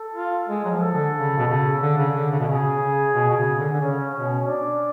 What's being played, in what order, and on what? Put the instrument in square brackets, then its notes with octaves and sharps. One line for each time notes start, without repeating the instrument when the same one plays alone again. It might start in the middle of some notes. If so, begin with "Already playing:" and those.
Already playing: [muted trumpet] A4
[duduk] F4
[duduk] G#3 [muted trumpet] G#4
[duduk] F#3
F3
[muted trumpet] A4
[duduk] D3
C#3
B2
C#3
D3
C#3
D3
C#3
B2
[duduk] C#3 [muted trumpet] G#4
[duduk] C#3
B2
B2
C#3
D3
D3
[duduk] C#3 [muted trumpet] C#4
[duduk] B2 [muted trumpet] C#4
[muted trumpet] D4